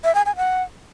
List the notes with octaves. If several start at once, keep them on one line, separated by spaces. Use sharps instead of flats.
E5
G#5
G#5
F#5